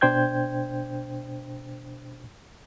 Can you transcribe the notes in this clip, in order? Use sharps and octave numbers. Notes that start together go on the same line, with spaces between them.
B2 D4 C5 G5 G6 G#6